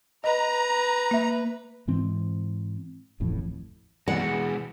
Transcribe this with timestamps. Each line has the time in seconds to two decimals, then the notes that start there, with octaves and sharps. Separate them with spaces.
0.24 B4 D#5 A#5
1.11 A#3 E5
1.88 G#2 E3 C4
3.20 D1 A1 F2 A2
4.08 B2 E3 G#3 G#4 F#5